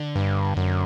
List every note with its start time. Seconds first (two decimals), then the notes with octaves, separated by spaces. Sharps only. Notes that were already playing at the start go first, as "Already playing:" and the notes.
Already playing: D3
0.16 G2
0.57 F#2